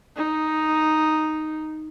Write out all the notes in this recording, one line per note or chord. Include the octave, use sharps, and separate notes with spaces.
D#4